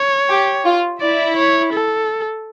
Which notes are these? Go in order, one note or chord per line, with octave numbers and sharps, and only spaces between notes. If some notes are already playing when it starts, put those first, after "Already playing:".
Already playing: C#5
G4
F4
E4 D5
C#5
A4